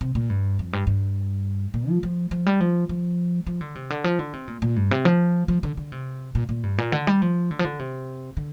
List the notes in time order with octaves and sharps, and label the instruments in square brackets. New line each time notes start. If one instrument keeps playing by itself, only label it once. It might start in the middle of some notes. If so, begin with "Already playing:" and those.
[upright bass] C3
A#2
G2
F2
G2
G2
A#2
F3
F3
F3
G3
F3
F3
F3
D3
C3
D3
F3
D3
C3
A#2
A#2
G2
C3
F3
F3
D3
D3
C3
A#2
A#2
G2
A#2
D3
G3
F3
D3
F3
D3
C3
D3